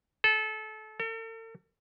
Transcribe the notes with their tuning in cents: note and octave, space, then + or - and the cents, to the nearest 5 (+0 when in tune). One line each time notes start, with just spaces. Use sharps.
A4 -25
A4 +45